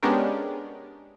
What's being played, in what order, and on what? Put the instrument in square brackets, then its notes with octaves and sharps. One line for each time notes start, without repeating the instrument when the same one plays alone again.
[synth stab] G#3 B3 C#4 D4 G4 A#4